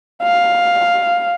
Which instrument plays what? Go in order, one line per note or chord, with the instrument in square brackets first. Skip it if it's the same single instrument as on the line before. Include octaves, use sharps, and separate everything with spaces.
[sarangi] F5